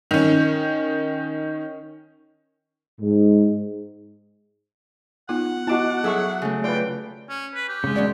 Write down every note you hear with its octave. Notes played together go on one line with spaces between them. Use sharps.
D#3 C#4
G#2
B3 D#4 F4 F#5
B3 E4 F#4 D#5 A5 D6
F#3 G#4 A4 E5 C#6
C#3 A3
F4 B4 D5 G5
C#4
B4
G4
C#3 G#3
E2 F#4 D5